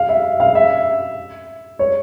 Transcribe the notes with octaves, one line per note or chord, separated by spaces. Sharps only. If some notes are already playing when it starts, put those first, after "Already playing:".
Already playing: F5
E5
F5
E5
C#5